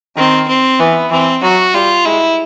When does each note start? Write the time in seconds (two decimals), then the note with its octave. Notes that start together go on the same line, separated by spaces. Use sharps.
0.16 D#3 C4
0.48 C4
0.79 E3 B3
1.11 E3 C4
1.42 F#3 F#4
1.74 G3 F4
2.05 G#3 E4